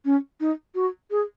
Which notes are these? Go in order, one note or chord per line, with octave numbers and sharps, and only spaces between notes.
C#4
D#4
F#4
G#4